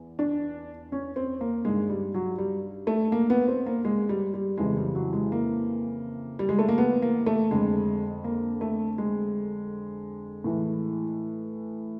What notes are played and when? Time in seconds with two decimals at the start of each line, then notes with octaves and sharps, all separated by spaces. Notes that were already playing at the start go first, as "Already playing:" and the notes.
Already playing: E2
0.19 D4
0.92 C#4
1.16 C4
1.41 A#3
1.65 G2 D#3 G#3
1.89 G3
2.14 F#3
2.38 G3
2.87 A3
3.12 A#3
3.30 B3
3.48 C4
3.66 A#3
3.85 G#3
4.09 G3
4.34 G3
4.58 F2 C#3 E3 G#3
4.77 G3
4.95 F#3
5.13 G#3
5.32 A#3
6.39 G3
6.49 G#3
6.59 A3
6.68 A#3
6.78 B3
7.02 A#3
7.26 A3
7.51 F2 D3 G#3
8.24 A#3
8.61 A3
8.98 G#3
10.44 A2 E3